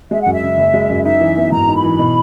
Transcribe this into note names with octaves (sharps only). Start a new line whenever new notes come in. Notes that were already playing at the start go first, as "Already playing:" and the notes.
G#3 E5
F#2 F#5
E5
C#3
F#1
G#3
F#2
D#4 E5
E3
B3
G#2 A#5
D#4
B5
E3
B2